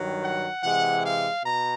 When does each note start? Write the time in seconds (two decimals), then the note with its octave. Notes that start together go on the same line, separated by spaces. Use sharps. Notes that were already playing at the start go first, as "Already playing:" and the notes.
Already playing: G2 D#3 F#3
0.23 F#5
0.64 C3 E3 G#3 F#5
1.04 F5
1.44 B2 A#5